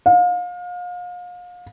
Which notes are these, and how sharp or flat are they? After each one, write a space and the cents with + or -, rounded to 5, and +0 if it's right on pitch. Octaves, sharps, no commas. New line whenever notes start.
F5 +35